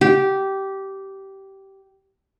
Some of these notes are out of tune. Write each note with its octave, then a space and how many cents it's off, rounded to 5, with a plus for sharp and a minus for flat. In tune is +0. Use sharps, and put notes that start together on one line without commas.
G4 -15